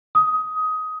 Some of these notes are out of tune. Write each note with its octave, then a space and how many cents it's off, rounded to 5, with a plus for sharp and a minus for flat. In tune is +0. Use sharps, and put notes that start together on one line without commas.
D#6 +15